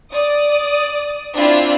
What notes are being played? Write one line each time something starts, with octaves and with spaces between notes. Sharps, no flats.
D5 D#6
C4 D4 E4 F4